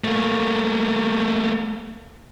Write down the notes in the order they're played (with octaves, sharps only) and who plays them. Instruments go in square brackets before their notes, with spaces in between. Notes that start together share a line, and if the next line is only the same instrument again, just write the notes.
[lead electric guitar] A3 A#3